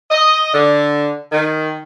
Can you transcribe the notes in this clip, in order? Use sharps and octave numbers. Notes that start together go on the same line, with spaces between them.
D#5
D3
D#3